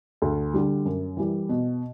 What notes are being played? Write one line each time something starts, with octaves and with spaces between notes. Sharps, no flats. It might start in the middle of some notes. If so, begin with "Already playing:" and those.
D2
D3 G3
F#2
E3 G3
B2